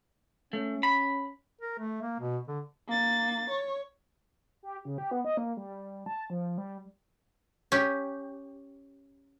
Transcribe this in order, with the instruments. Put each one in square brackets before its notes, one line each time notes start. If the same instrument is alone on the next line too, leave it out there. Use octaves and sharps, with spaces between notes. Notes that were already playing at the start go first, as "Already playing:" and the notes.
[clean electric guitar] A3 [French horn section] C#4
[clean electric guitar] B5
[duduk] A#4
A3
A#3
B2
D3
[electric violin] A#3 A6
C#5
[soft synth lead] G4
C#3
G4
B3
D#5
A#3
G3
A5
F3
G3
[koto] C#4 G4